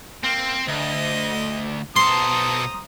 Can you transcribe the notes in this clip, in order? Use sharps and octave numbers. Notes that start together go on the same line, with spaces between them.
A#3 C4
D2 D#5
B1 A4 C5 A#5 C6 D#6